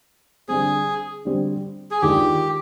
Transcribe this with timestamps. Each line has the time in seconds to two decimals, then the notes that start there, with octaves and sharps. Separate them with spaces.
0.48 D3 G3 C4 G#4
1.25 D3 G3 C4
1.91 G#4
2.02 D#2 D#3 G#3 D4 F4 G4